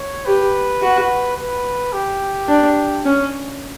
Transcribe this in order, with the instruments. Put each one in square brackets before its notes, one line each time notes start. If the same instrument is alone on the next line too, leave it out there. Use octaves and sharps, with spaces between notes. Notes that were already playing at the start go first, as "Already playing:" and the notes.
Already playing: [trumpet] C#5
[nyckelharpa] G4 [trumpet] B4
[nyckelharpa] F#4
[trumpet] B4
G4
[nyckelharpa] D4
C#4